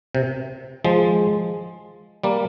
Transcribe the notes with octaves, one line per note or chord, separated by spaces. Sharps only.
C3
F3 G#3
G3 A#3